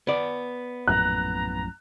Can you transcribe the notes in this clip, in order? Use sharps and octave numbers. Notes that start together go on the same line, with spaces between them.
B3 D5
A#1 F#2 A2 A#5 F#6